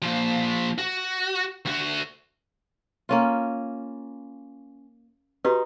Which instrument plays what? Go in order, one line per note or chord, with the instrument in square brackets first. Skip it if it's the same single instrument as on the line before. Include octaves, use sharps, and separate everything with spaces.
[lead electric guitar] A#2 F3
F#4
D2 F#4
[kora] A#3 C#4 F4
[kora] D#4 [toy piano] F#4 G4 B4